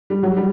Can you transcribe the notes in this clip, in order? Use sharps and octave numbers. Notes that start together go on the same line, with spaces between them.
G3
F#3
G3